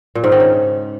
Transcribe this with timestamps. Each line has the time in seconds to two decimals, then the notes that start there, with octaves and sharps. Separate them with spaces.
0.15 A#2
0.24 G#2
0.32 D#3
0.40 C#3